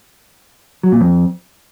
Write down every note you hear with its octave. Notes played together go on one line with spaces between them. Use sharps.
F#3
A#2
F2